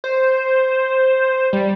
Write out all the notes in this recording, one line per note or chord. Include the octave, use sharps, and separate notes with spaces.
C5
G3